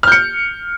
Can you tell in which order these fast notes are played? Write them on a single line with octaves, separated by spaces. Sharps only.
F6 G6 C#7